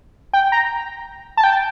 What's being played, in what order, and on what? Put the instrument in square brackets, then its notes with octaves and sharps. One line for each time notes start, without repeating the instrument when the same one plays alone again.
[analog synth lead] G5
A#5
A5
G5